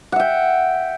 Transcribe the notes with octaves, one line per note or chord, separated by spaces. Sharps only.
E5 F#5 G5